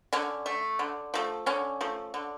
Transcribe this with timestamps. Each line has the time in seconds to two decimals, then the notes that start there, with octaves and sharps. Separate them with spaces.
0.13 D3 C#4
0.46 A3
0.79 D3
1.14 F3 A3
1.46 D3 C#4
1.81 F3 A3
2.14 D3